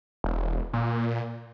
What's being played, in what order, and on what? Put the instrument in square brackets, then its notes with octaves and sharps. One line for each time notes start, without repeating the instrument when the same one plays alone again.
[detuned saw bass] E1
A#2